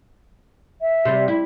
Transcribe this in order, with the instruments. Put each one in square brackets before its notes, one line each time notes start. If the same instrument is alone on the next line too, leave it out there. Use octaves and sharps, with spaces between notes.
[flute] E5
[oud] C3 G3
E4